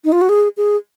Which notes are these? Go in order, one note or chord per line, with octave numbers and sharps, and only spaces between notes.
D#4
F4
F#4
G#4
G#4